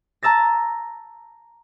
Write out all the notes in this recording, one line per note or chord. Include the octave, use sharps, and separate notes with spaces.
A5 A#5 E6 A6 A#6